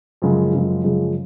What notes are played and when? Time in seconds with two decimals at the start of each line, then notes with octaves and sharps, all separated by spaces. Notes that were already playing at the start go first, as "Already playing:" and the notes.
0.22 F#2 C#3 F3 G#3
0.53 F#2 C#3 F3 G#3
0.84 F#2 C#3 F3 G#3